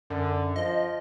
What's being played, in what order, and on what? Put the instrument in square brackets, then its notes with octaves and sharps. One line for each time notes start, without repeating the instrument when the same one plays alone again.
[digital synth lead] F#2 [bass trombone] D3
[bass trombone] F3 [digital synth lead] D#5